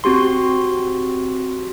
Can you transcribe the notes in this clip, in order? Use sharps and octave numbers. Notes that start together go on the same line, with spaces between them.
C4 F#4 G4 C6